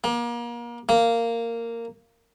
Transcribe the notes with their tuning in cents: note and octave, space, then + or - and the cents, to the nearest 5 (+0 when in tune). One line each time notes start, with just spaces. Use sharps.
A#3 +35
A#3 -10